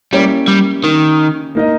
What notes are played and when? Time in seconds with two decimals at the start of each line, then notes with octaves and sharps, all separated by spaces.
0.12 G3 A#3 C#4 E4 G4 C#5
0.48 G3
0.84 D#3
1.55 A#3 D#4 A#4 D#5